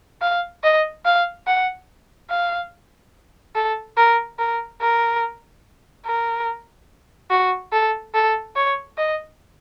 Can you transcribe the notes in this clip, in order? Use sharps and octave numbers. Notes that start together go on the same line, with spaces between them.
F5
D#5
F5
F#5
F5
A4
A#4
A#4
A#4
A#4
F#4
A4
A4
C#5
D#5